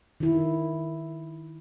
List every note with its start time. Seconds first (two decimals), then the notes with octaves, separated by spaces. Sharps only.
0.20 D#3 E4